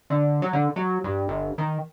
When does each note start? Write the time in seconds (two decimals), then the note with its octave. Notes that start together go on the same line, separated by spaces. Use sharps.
0.10 D3
0.42 F#3
0.53 D3
0.76 F#3
1.04 G2
1.28 G1
1.58 D#3